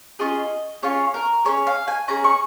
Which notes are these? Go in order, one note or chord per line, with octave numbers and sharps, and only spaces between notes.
C#4 F4 G#4 D#5
C#4 F4 G#4 C#5
A#4
C#4 G#4 C#5
F5
G#5
C#4 G#4 A#5
C#6